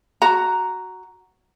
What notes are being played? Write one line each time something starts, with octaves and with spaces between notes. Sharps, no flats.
F#4 A#5